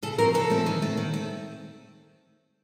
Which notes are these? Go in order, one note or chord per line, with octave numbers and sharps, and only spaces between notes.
C#3 A4
F3 A3 C4 A#4
C#3 A4
F3 A3 C4
D#3
A3 C4
D#3
A3 C4